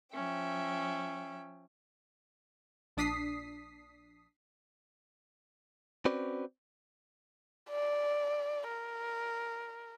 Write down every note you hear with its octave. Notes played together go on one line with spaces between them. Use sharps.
F3 C#4 E5 G5
A#1 D4 D#6 B6 C7
C4 C#4 F#4 B4 C5 D5
D5
A#4